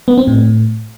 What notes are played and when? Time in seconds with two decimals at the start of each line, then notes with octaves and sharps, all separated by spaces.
0.08 B3
0.18 C4
0.27 A2